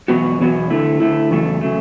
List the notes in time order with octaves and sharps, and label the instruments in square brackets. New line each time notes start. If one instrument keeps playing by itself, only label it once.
[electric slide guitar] E2 B2 F#3 B3 F#4
E2 B2 F#3 B3 F#4
D3 A3 E4
D3 A3 E4
E2 C#3 F#3 A3
C#3 F#3 A3